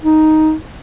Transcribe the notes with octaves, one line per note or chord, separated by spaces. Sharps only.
D#4